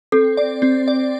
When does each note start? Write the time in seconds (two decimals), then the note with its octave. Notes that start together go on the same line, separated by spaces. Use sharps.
0.12 C4 A4
0.37 D5
0.62 C4
0.88 D5